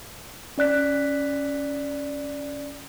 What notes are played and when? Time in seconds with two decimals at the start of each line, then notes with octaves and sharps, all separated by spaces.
0.58 C#4 D5 F#6 B6